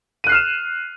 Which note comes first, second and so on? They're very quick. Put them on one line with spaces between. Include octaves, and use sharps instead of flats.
D#7 F#6 C7 F6 E7